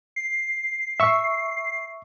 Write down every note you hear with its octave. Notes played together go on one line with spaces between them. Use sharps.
C7
E5 C#6